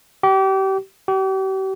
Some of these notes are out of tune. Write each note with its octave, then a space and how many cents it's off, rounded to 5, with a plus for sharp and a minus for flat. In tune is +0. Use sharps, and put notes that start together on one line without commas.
G4 -30
G4 -40